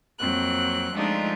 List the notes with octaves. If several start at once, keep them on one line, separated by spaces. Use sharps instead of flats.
F2 F#3 A#3 C4 F#6
F3 G#3 A3 D4 D#4 F4